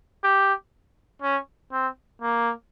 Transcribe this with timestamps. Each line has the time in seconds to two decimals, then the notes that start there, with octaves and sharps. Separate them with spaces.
0.24 G4
1.22 C#4
1.72 C4
2.22 A#3